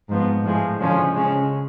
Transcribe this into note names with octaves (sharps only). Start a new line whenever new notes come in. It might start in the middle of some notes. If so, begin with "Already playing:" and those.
G#2 F3 B3
A2 F3 G#3
D3 F3 G#3 C#4
C#3 G#3 C#4